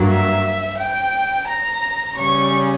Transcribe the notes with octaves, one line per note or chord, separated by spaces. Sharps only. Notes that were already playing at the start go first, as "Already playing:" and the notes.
Already playing: G2 F#3 A#3
E5
G5
A#5
C#3 G3 C#4 C#6